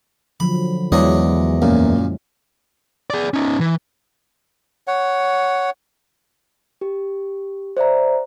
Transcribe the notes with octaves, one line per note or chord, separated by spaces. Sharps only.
D3 F3 F#3 B5
E2 F#3 G#3 D4 E4 C#5 D#5
F#2 A#2 A#3
G#4 D5
C#4 D#4
E3
C#5 F#5
G4
C5 D5 E5 A#5